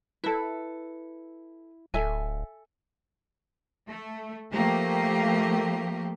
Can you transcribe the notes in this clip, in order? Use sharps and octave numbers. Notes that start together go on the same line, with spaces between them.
E4 A4 B4
D1 A4 E5 G#5
A3
F3 A3 A#3 G4